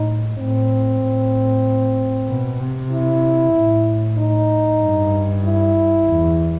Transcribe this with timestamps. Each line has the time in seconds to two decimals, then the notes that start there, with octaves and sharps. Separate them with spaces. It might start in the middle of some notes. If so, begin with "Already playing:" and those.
Already playing: A2 D#4
0.38 A2 C4
1.01 A2
2.28 B2
2.60 C3
2.92 E4
3.55 A2
4.18 D#4
4.82 G2
5.45 E4
6.09 E2